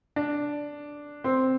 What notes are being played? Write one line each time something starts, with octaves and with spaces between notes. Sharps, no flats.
D4
C4